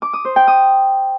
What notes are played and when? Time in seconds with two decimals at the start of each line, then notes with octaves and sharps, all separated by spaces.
0.02 D6
0.13 D#6
0.25 C5
0.36 G5
0.48 D#6